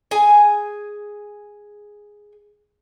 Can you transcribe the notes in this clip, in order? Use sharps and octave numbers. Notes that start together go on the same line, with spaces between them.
G#4 G#5